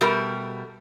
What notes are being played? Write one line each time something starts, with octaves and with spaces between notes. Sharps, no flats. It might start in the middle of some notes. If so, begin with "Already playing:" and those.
B2 G3 A3 G4 A#4